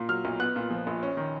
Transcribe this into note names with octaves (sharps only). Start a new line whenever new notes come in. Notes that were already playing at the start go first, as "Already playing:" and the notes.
Already playing: A#2 A#3
F#3 F6
B1
B3 F#6
A#2
F3
A#1
C#4
D#3